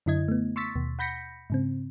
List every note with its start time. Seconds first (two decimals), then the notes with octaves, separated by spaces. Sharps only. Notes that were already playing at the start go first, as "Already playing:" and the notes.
0.06 F#2 D3 E4 D#5 G#6
0.28 A3 B3
0.56 C6 C#6 E6 A6 B6
0.76 D#2 B2
0.99 F#5 B5 G6 A#6 B6 C#7
1.50 G#2 C#3 C4